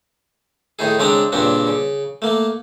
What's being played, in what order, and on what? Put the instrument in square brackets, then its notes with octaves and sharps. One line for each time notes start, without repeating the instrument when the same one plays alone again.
[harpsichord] A2 D#3 D#4 G#4
C#3 G#3 C4 D4 A#5
G2 A#2 C#3 C4 D4
C#3
A3 A#3